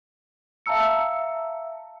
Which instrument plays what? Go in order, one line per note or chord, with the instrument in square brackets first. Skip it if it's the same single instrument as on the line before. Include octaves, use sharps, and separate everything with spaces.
[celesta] E5 F5 A5 A#5 E6 C#7